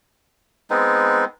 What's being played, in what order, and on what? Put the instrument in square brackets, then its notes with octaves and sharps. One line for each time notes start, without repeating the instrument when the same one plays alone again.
[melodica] G#3 B3 C4 D#4